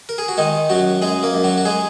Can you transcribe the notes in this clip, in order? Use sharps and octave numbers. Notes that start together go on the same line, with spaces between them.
A#4
G#4
F#4
D#3 G#3 D#4
F#2 F#3 F#4
F#2 G#3 G#4
A#3 A#4
F#2
F#3 F#4
F#4
G#3 G#4